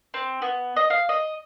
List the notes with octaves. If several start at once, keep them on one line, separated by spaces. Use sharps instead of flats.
C4
B3
D#5
F5
D#5